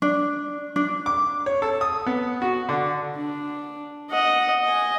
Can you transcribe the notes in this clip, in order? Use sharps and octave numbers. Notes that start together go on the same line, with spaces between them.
D4
D4
D6
C#5
A4
D#6
B3
F#4
D3
D4
D#5 F#5
D#5 G#5